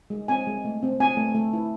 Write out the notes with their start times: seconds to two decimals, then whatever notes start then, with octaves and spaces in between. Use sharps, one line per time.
0.10 G#3
0.28 C4 G#5
0.47 G#3
0.65 A3
0.83 C4
1.00 C4 G#5
1.17 A3
1.35 A3
1.53 E4